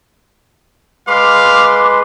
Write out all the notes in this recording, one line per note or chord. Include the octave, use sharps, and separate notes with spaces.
G#3 B4 F5 C6 D6